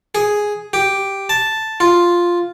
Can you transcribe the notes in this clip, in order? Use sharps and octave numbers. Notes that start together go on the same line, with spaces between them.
G#4
G4
A5
F4